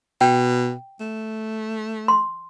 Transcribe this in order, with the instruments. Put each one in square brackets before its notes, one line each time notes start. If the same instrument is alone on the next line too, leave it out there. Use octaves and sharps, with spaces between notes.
[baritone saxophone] B2 [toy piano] G5
[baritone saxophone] A3
[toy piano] C6